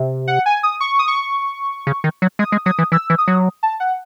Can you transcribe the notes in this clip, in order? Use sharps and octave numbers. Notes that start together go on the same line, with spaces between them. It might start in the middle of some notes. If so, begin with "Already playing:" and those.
Already playing: C3
F#5
G#5
D#6
C#6
D#6
C#6
C#3
D#3
F#3
G#3 D#6
G#3
F#3 D#6
E3
E3 E6
E3
D#6
F#3
A5
F#5